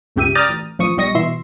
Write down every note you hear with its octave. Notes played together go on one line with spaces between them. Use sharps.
G1 C#2 C#3 G4 E5 D#7
D5 G5 A#5 D#6 F6 A6
A1
A1 F3 C#6 D#6
B1 G3 D#5 C#6 A#6
B2 E3 E5 C6